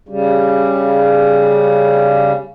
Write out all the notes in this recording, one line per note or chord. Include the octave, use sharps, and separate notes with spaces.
C#3 G3